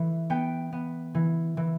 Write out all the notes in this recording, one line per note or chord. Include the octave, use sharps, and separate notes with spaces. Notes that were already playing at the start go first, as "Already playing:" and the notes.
Already playing: E3 A3 E4
B3 G5
B3
E3
E3